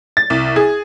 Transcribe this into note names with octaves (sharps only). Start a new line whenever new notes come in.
A6
C2
G#4